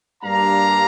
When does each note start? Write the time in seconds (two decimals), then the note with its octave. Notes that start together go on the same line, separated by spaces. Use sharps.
0.24 G2 G3 A#3 D4 F5 A#5